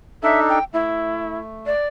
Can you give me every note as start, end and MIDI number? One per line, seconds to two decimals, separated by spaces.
0.23 0.59 62
0.23 0.59 63
0.23 0.59 69
0.23 0.40 76
0.49 0.64 79
0.73 1.74 57
0.73 1.39 64
1.66 1.88 74